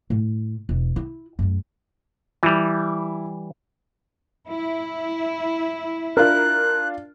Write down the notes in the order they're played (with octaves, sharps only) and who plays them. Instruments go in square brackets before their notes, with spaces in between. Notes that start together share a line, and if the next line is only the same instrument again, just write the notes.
[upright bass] A2
E1
E4
F#2 A3
[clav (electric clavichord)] E3 G3 [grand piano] E4
[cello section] E4
[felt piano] D4 F4 [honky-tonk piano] A#4 [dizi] F#6